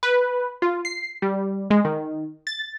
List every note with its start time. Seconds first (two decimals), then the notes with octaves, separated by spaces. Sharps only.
0.03 B4
0.62 F4
0.85 C7
1.22 G3
1.71 G#3
1.85 D#3
2.47 A6